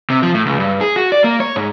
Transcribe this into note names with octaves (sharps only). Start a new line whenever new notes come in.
C3
F3
A2
C#2
G2
G#4
F#4
D5
A#3
C#5
G#2